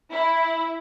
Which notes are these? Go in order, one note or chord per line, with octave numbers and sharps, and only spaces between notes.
E4